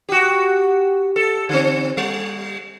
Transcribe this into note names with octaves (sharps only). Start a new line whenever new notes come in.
F#4 G4
A4
D3 C4
G3